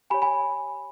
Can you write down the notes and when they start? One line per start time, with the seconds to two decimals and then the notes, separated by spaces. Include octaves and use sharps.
0.10 G4 C#5 G#5 B5
0.22 G#5 B5